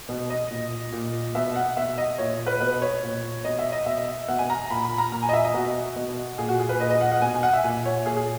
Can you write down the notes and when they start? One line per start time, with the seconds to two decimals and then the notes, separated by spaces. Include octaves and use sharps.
0.09 B2
0.30 D#5
0.51 A#2
0.92 A#2
1.35 B2 E5
1.56 F#5
1.77 B2 E5
1.98 D#5
2.18 A#2 C#5
2.46 B4
2.60 B2 B4
2.82 C#5
3.03 A#2
3.44 B2 D#5
3.59 E5
3.72 D#5
3.86 B2 E5
4.28 B2 F#5
4.39 G#5
4.50 A#5
4.70 A#2 B5
4.85 B5
4.98 A#5
5.12 A#2 A#5
5.23 G#5
5.29 D#5
5.33 E5
5.44 D#5
5.54 B2 F#4
5.96 B2
6.38 A#2 G#4
6.49 F#4
6.59 G#4
6.69 B4
6.80 A#2 D#5
6.90 D#5
7.01 F#5
7.12 F#5
7.22 B2 G#5
7.35 G#5
7.43 F#5
7.53 E5
7.64 A#2 G#5
7.86 C#5
8.06 A#2 G#4
8.17 G#4